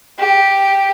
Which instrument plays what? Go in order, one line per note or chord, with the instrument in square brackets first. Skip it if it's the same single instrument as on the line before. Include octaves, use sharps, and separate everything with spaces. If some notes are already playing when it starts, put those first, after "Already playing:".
[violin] G4